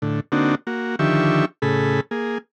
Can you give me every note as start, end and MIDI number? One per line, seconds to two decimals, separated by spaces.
0.02 0.20 45
0.02 0.20 50
0.32 0.55 50
0.32 0.55 58
0.32 0.55 60
0.32 0.55 62
0.32 0.55 63
0.32 0.55 66
0.67 0.96 58
0.67 0.96 66
0.99 1.45 50
0.99 1.45 51
0.99 1.45 53
0.99 1.45 67
0.99 1.45 76
0.99 1.45 85
1.62 2.01 45
1.62 2.01 49
1.62 2.01 68
1.62 2.01 69
1.62 2.01 83
2.11 2.38 58
2.11 2.38 68